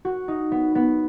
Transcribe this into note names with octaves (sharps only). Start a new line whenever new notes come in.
F#4
D#4
B3
B3